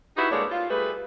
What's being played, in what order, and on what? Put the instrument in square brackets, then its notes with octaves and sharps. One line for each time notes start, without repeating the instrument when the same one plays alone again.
[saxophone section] D#4 E4 F#4 G4 B4
G2 G#3 A#3 D4 A4 C#5
F4
G3 A3 G#4 B4